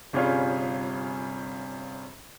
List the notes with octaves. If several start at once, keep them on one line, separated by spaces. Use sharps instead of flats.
G1 C3 G3 C#4 F4 G#4